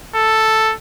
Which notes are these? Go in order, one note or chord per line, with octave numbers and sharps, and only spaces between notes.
A4